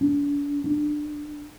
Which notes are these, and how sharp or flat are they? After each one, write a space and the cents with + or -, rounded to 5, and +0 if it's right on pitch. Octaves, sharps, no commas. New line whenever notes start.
D4 -40
D4 +20